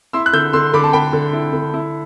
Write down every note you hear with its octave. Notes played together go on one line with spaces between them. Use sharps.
E4 C6 E6
F#6
D3 E6 G6
D3 C6 E6
D3 B5 D6
A5
D3 G5 B5
D3
E4
D3
E4